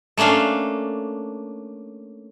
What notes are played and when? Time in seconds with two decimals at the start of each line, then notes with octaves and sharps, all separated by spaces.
0.17 A3 A#3 C#4 D4 F5